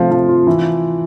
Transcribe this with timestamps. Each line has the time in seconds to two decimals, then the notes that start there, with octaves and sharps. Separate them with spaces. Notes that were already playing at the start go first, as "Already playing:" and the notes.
Already playing: C3 F3 A3
0.11 F3
0.29 F4
0.47 E3